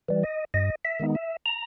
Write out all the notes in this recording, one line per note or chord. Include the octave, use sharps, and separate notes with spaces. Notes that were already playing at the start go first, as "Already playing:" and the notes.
E3 G3
D#5
G2 D#5
E5
D#3 G#3 B3 D#4
E5
A#5